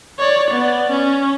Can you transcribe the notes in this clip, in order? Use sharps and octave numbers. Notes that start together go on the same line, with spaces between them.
C#5 D5
B3 D5
C#4